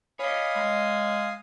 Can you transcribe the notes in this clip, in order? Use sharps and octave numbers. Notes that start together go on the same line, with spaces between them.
C#5 D#5 F5 G#5 B5 D#6
G#3